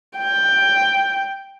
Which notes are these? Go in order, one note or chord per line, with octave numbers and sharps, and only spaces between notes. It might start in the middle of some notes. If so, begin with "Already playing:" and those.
G5